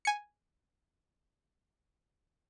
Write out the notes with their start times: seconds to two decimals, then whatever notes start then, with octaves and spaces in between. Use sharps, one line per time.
0.05 G#5 C#7